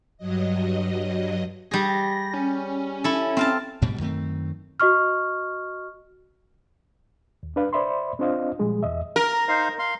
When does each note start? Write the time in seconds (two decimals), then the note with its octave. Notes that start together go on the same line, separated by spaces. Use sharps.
0.18 G2 F#3 D#5
1.71 G3 G#4 A#6
2.34 C#4
3.04 E4 A4
3.37 C4 F5 A5
3.82 D2 G#2 B2 G3
3.99 F#2 D#3 A3 C4
4.80 F#4 D#5 C#6 F6
7.43 D#2
7.56 D4 B4 F5
7.73 C5 D5 E5 B5 C6
8.19 C4 D4 F4 C5 D#5 F5
8.59 A#2 F3 G3 G#3 G#4
8.83 E2 D#5 E5
9.16 A#4
9.33 A#5
9.48 D#4 C5 F5
9.79 F5 C6